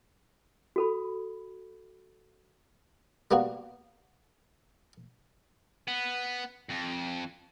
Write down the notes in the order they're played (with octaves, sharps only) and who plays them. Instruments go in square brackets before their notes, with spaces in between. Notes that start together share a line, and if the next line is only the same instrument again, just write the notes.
[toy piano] F#4 A4 B5
[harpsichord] G3 A#3 B3 F#4
[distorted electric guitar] B3
F2